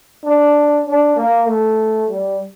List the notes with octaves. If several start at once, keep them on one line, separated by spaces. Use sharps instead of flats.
D4
D4
A#3
A3
G3